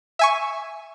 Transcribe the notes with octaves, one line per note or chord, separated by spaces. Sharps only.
E5 G#5 C#6